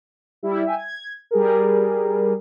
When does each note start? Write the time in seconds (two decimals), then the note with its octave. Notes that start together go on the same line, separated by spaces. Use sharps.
0.43 G3 E4
0.65 E5 G5 G#5
0.78 G#6
1.31 G3 G#4 A#4